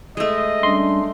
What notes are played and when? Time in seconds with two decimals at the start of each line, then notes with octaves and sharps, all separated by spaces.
0.17 G#3 A3 D#5
0.63 G3 C#4 D4 C6